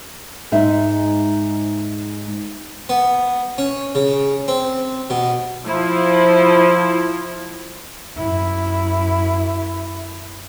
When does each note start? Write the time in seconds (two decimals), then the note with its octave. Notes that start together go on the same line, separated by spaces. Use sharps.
0.52 G#2 G#3 D#4 E5
2.89 B3
3.58 C#4
3.95 C#3
4.48 C4
5.10 B2
5.66 F3 E4
8.17 F#2 E4